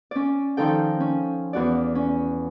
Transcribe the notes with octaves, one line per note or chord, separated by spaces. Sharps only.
C#4 D5
D#3 F3 D#4 A4 G5
C#4
E2 F#4 D5
C#4